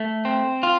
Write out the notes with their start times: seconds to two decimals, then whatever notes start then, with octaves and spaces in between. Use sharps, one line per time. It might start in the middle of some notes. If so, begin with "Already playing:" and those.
Already playing: A3
0.25 C4
0.63 F4